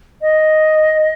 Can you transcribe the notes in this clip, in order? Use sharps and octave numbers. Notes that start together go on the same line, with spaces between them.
D#5